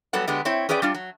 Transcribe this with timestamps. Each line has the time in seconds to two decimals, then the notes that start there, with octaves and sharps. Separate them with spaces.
0.13 F#3 G3 B3 A4 F#5
0.28 D3 G#3 B3 G4
0.45 C4 E4 C#5 G5
0.69 C#4 G#4 B4 D5 F#5 G5
0.82 G3 D4 F4
0.94 F#3